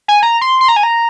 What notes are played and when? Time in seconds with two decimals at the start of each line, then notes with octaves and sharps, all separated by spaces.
0.08 G#5
0.23 A#5
0.41 C6
0.61 C6
0.68 A#5
0.76 G#5
0.83 A#5